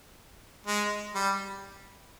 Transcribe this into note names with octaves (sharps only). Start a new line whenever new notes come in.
G#3
G3